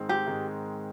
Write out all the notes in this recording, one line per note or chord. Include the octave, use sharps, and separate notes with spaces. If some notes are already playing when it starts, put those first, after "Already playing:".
Already playing: G#2 D#3 G#3 C4
G4
G#2 D#3 G#3 C4